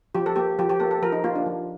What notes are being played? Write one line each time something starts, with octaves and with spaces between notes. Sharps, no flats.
F3 G4
A4
A#3 G4
F3 G4
G4
A#3 A4
A4
F3 A#4
D#4
A#3 F4
D4
F3